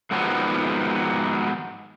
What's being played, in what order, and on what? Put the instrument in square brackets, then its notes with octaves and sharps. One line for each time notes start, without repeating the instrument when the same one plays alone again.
[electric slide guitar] G#2 D#3 F3 F#3 B3 G4